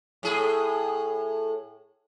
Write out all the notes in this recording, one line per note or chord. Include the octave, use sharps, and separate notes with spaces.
A2 G#4